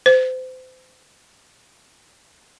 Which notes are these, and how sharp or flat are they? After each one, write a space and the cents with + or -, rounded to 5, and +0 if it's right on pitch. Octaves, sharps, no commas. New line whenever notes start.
C5 -30